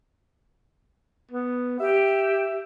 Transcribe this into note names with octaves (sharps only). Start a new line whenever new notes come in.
B3
G4 E5